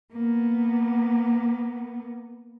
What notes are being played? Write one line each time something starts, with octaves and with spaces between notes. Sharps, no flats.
A#3 B3